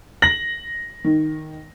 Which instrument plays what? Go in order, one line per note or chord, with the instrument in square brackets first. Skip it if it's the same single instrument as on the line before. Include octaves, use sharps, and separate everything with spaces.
[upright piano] A#6 F#7
[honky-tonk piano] D#3